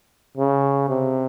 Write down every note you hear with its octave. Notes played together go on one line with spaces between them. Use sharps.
C#3
C3